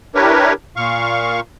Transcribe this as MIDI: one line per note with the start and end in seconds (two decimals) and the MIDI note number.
0.15 0.53 62
0.15 0.53 64
0.15 0.53 67
0.15 0.53 70
0.15 0.53 71
0.15 0.53 73
0.76 1.40 46
0.76 1.40 77
0.76 1.40 85